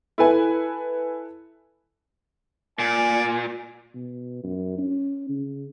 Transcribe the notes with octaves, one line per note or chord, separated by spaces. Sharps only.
E4 A4 B4 G#5
A#2 D5 G#5
B2
F#2
C#4
C#3